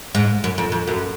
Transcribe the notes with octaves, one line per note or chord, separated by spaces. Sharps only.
G#2
F#2
F2
F2
F#2